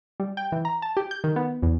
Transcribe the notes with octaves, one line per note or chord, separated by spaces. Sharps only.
G3
G5
E3
A#5
A5
G4
G6
D#3
B3
E2